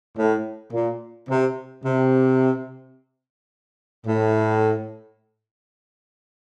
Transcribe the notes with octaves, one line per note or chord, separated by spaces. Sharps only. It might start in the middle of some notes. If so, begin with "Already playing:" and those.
A2
A#2
C3
C3
A2